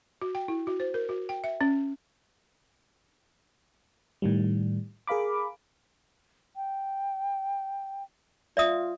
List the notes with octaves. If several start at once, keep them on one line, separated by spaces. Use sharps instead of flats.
F#4
G5
E4
F#4
C5
A#4
F#4
G5
E5
C#4
A2 D#3 G3
G#4 A#4 F5 B5 D6
G5
F4 D5 E5 D#6